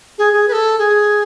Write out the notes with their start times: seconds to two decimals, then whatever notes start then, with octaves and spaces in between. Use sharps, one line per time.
0.18 G#4
0.33 G#4
0.48 B4
0.53 A4
0.79 G#4